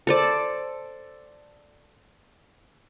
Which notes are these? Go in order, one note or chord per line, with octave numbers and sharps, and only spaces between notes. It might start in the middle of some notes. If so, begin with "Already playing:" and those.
A4 C5 D5